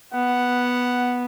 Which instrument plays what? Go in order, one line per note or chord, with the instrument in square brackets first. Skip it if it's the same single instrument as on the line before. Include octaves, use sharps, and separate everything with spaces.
[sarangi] B3 [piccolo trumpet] F#5